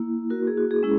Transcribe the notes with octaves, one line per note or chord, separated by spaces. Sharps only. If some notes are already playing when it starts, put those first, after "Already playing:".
Already playing: A#3 E4
F#4 A#4
G#4
F#4
G#4
G#3 C#4 E4